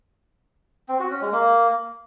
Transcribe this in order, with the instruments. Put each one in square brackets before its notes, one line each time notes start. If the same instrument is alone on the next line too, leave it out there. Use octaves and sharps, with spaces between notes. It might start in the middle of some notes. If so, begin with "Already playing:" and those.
[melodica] C4
F#4
C#4
G#3
A#3